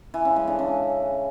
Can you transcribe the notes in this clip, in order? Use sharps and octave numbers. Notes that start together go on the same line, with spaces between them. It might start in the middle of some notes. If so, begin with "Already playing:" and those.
E3
C#3
G#3
D3
C#3